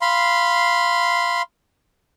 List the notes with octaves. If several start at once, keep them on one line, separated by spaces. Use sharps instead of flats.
F5 B5 C6